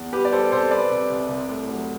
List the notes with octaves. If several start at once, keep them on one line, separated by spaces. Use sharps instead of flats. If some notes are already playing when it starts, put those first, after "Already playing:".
Already playing: E2
G3 G4 B4
D5
G3 A4 C5
C3 A4 C5
G3 B4 D5
C3
C2
C2
A2
F#3